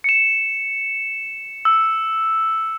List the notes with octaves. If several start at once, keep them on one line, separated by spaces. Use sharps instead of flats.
C#7 E7
E6